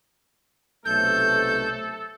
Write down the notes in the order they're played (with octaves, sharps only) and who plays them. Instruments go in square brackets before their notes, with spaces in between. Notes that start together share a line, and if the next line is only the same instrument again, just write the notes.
[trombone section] B1 C3 A3 [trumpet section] A4 [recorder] G6